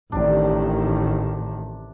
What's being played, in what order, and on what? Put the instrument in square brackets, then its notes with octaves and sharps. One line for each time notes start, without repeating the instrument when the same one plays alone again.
[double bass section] A1 D#3 [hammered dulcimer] C3 D4